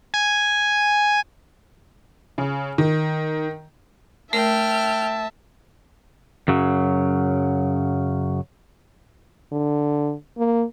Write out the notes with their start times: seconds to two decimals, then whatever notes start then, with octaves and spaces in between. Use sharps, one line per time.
0.14 G#5
2.38 C#3
2.78 D#3
4.33 A3 A#4 E5 G5 A5 F6
6.48 F#2 C#3 F#3
9.52 D3
10.38 A#3